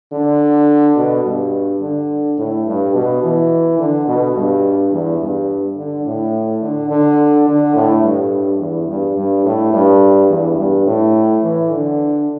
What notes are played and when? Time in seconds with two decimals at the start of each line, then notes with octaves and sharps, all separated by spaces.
0.12 D3
0.97 B2
1.25 G2
1.81 D3
2.38 A2
2.67 G2
2.95 B2
3.23 E3
3.79 D3
4.08 B2
4.36 G2
4.92 E2
5.21 G2
5.77 D3
6.06 A2
6.62 D3
6.90 D3
7.47 D3
7.75 A2
8.03 G2
8.60 E2
8.88 G2
9.16 G2
9.45 A2
9.73 G2
10.29 E2
10.57 G2
10.86 A2
11.43 E3
11.71 D3